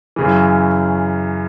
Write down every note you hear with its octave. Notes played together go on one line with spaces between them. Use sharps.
F#2 C#3 E3